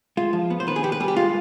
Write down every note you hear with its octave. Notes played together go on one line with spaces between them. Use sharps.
G#3 F4
F3
B3
C5
D#3 B4
G#4
B3 G4
B4
G3 G#4
G4
G#3 F4